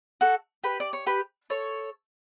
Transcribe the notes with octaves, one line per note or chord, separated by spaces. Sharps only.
F#4 A4
G4 B4
D5
C#5
G4 B4
A4 C#5